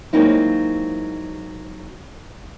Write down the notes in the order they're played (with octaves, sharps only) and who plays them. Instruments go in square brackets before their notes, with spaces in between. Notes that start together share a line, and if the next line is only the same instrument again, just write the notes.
[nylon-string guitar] F#3 G#3 A#3 C4 D#4 E4